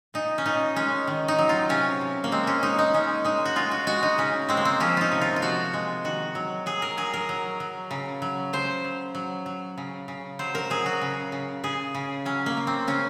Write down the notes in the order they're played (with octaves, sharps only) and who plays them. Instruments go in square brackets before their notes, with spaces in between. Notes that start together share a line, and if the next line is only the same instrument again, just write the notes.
[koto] A#2 D#4
C#4
A#2 D#4
G#3 C#4
D#3
D#4
F#3
F4
C3 C#4
C3
A#3
G#3 C4
C#4
G#3 D#4
D#4
G#3 C#4
G#3 D#4
F#4
G#3 F4
F#4
G#3 F#4
D#4
C#3 C#4
G#3 C4
A#3
C4
F3 C#4
D#4 F4
C3
F4
F4
F3 F#4
G#3
D#3 F#4
F#3
F#3 G#4
A#4
F#3 G#4
A#4
F#3
F#3
C#3
F#3
C#3 C5
F#3
F#3
F#3
C#3
C#3
F#3 C5
A#4
F#3 G#4
F#4
C#3
C#3
C#3 G#4
C#3
F#3 C#4
A#3
C#3
C4
C#3 C#4